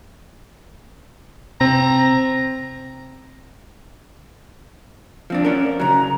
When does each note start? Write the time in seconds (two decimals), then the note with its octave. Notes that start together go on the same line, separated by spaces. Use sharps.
1.61 C3 C4 A#5
5.30 F3 C4 D4
5.45 C#4 A#4 D5
5.80 C#3 F#3 A#5